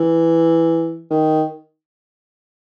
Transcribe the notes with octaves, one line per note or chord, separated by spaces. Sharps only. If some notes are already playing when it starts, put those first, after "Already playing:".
Already playing: E3
D#3